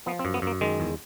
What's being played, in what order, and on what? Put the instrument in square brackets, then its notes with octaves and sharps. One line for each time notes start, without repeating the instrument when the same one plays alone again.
[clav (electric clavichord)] F3 B3
C4
F#2
B3
F#2 A#3
D#3 G#3
E2